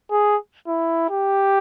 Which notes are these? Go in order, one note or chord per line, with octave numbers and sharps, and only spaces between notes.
G#4
E4
G4